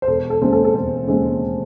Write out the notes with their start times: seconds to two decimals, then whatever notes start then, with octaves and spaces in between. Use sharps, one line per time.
0.02 C5
0.07 E1 A4
0.30 A4
0.41 D#2 C#3 G#3 C4
0.52 A4
0.65 A4
0.74 E1 C5
1.07 D#2 C#3 G#3 C4